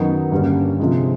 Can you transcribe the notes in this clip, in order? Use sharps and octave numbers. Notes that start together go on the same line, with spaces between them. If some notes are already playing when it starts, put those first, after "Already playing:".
Already playing: F#2 D#3 F#3 B3 D#4
G2 D3 G3 A#3 C#4
C3 F3 G#3